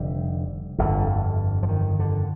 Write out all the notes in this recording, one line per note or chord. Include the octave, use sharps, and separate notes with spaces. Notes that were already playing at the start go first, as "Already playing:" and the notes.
Already playing: F1 D3 G3
G1 F2 D3
F3
D#3
D3